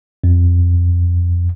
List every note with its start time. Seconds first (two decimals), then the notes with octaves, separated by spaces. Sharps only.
0.24 F2